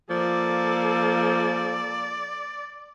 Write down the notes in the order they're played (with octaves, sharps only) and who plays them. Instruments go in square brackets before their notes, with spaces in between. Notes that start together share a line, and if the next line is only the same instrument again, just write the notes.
[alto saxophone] F3 [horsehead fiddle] A#3 A4 [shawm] D5